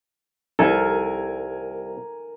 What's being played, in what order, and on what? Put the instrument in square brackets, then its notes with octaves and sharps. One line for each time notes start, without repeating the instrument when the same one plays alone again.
[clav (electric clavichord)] C2 A4 [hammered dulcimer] A#4 G#5